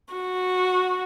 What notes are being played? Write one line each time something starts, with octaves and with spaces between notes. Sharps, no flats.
F#4